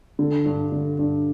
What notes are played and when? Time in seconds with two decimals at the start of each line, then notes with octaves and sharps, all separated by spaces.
0.19 D3
0.46 G2
0.72 D3
0.99 G2